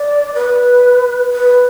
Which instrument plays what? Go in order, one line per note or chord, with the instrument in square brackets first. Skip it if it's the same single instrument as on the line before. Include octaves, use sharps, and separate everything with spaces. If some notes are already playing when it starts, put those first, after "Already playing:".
Already playing: [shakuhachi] D5
B4
B4